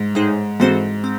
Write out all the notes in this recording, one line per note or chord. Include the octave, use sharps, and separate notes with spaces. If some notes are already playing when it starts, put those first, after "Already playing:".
Already playing: G#2
A2 G#3 D#4 G#4 C5
G#2 E3 C4 F#4 A4 C5
C4